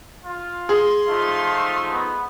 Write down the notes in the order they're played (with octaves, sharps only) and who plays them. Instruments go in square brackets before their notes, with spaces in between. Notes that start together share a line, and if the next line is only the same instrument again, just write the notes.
[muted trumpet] F4
[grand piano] G#4 [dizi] C6
[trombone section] F3 A3 D#4 [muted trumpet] F4
[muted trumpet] B3